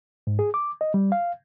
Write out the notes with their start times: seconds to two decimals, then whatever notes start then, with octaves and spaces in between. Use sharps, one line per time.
0.27 G#2
0.39 G#4
0.54 D6
0.81 D#5
0.94 G3
1.12 F5